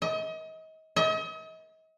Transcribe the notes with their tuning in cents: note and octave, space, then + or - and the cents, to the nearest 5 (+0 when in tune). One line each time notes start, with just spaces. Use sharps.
D#5 +35
D#5 +40